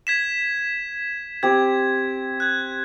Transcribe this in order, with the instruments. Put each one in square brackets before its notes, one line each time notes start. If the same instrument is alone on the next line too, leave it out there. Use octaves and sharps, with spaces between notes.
[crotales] G#6 B6 E7
[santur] C4 G4 [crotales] G#6
[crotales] F#6 G#6